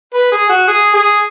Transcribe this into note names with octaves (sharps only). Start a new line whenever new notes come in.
B4
G#4
F#4
G#4
G#4